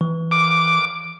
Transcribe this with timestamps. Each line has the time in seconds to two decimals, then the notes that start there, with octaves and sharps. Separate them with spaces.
0.01 E3
0.31 D6